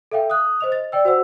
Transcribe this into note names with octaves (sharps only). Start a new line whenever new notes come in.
A4 E5 F5 G5
D#6 F#6
C5 D#5 F7
A6
D5 G5 E6
F#4 C5 F#5 E6